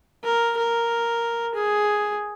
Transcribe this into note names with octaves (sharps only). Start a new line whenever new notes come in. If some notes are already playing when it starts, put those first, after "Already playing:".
A#4
A#4
G#4